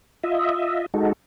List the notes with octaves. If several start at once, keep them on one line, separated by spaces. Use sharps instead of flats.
F4 D#5 E5
G#3 D#4 F#4 A4